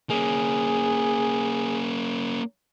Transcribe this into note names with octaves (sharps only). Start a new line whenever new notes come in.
A#3 C#4 G#4